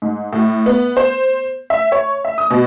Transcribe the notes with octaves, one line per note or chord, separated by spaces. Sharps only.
G#2
A2
B3
C5
E5
C#5
E5
D#6
B2